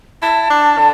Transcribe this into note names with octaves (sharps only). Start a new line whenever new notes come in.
E4 A5
D4
D3